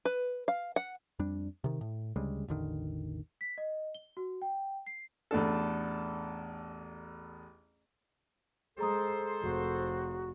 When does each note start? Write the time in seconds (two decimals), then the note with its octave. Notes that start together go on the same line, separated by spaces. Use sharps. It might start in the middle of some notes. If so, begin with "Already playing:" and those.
0.05 B4
0.48 F5
0.76 F#5
1.19 F2 G3 D4
1.64 C3 D#3
1.81 A2
2.16 D2 C#3 G3 G#3
2.48 A1 E2 D3 D#3
3.41 B6
3.58 D#5
3.94 G7
4.17 F#4
4.42 G5
4.86 C7
5.31 A1 E2 A3 D4 A4
8.78 G#3 G#4 A4 C5 A#5 D#6
9.43 F1 F#4